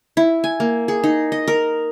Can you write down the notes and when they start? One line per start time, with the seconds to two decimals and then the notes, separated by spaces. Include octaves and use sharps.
0.17 E4
0.44 G#5
0.60 A#3
0.88 G#4
1.04 D#4
1.32 D#5
1.48 A#4